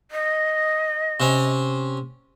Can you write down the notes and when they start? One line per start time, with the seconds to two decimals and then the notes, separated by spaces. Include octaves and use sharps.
0.11 D#5
1.20 C3 C#4